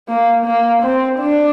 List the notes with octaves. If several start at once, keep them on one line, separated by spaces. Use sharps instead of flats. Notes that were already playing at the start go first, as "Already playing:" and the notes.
A#3
A#3
C4
D4